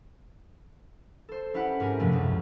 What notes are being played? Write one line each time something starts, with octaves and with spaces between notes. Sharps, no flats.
A4 C5
C#4 E4 G4 B4 F#5
G#2 C4 G4 A#4 G#5
F#2 A2 C3 F3 A3 C#4
C#2 B2 C4